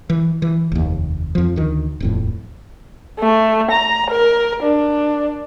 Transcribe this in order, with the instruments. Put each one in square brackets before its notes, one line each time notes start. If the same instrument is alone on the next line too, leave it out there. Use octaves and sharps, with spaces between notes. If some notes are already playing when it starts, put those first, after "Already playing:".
[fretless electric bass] E3
E3
F1 D#2
F2 F3
D2 D#3
D#1 F2 A2
[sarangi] A3
A#5
A#4
D4